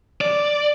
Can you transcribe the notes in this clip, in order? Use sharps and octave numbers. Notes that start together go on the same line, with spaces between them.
D5